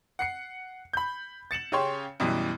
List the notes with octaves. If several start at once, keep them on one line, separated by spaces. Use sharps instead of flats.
F#5 C7 C#7
B5 G6
A6 C#7 E7 F#7
C#3 C#4 G4 C#5 C6
F#2 B2 E3 G3